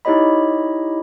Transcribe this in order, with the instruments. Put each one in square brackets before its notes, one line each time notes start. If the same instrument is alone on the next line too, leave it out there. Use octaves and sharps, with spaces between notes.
[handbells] D#4 E4 G4 C#5 D#5 B5